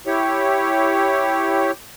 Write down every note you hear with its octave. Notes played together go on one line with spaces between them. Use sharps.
E4 G4 C#5